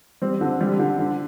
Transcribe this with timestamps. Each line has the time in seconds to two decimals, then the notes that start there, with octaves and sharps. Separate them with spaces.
0.22 G3 C4
0.41 D3
0.61 G3
0.79 D3
0.99 D3